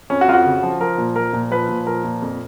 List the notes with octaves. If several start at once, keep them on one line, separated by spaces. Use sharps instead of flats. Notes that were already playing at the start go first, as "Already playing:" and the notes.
F2 C#4
F#4
F2 F4
F#4
C#3
F3
F3 A#4
A#2
F3 A#4
A#2
F3 B4
A#2
F3 A#4
A#2
F2